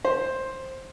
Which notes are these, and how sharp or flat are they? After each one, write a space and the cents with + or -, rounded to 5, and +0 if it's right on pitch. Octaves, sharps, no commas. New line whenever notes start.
C5 +10